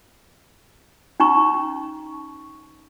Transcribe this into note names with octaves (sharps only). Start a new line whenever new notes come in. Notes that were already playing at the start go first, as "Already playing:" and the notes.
C#4 D#4 A#5 C#6